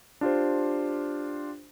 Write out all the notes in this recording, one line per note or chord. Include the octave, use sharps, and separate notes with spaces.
D4 F4 G4 C5